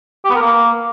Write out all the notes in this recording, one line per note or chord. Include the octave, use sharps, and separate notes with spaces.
G4
B3
A#4
A#3